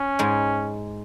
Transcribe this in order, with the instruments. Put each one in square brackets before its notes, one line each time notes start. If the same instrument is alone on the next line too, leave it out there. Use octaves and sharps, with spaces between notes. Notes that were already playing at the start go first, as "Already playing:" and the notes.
Already playing: [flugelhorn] C#4
[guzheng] G#2 G#3